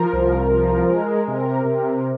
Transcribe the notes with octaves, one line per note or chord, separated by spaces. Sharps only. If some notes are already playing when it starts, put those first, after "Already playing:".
Already playing: F3 A#4
C2
F3
G#3
C3 A#4
C3